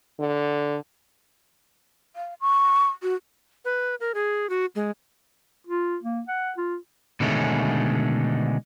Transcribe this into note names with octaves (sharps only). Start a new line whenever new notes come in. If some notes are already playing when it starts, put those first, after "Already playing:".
D3
F5
C#6
F#4
B4
A#4
G#4
F#4
G#3
F4
A#3
F#5
F4
B2 D3 D#3 G#3 A3 C#4